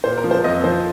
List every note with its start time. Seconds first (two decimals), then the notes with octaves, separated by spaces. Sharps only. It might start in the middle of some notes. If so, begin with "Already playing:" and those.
0.04 A#2 C5
0.17 A#4
0.24 F3
0.31 C5
0.44 F2 D#5
0.64 F3 C5